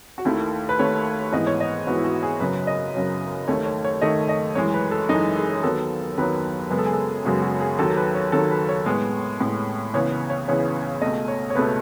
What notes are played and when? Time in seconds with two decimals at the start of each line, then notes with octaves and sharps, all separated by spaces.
0.18 F#4
0.25 D#2 D#3 A3 E4
0.69 B4
0.79 D#2 D#3 A3 C#5
1.32 G#2 E3 B3 D#5
1.47 C#5
1.60 D#5
1.87 G#2 E3 B3 F#4
1.97 E4
2.04 F#4
2.23 G#4
2.40 F#2 C#3 F#3 B4
2.67 D#5
2.94 F#2 C#3 F#3
3.48 D#2 D#3 A3 C#5
3.66 C#5
3.84 C#5
4.02 D#2 D#3 A3 D#5
4.29 D#5
4.55 F#2 E3 G#3 C#5
4.74 B4
4.91 A4
5.09 F#2 E3 G#3 D#4
5.37 G#4
5.53 G#4
5.63 D#2 D#3 F#3 B3 A4
6.17 D#2 D#3 F#3 B3 B4
6.70 F#2 C#3 G#3 B3 B4
6.78 A4
6.86 G#4
6.93 A4
7.25 F#2 C#3 G#3 B3 F#4
7.42 F#4
7.61 G#4
7.79 D#2 D#3 F#3 A4
7.97 B4
8.14 C#5
8.32 D#2 D#3 F#3 A4
8.51 B4
8.69 C#5
8.86 A2 G#3 B3
9.41 A2 G#3 B3
9.94 C#2 C#3 E3 B3 C#5
10.12 B4
10.30 C#5
10.48 C#2 C#3 E3 B3 C#5
11.02 C#2 B2 A3 D#5
11.28 C#5
11.50 C#5
11.55 C#2 B2 A3 B4